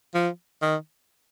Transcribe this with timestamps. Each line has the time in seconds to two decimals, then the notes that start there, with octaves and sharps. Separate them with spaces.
0.14 F3
0.62 D#3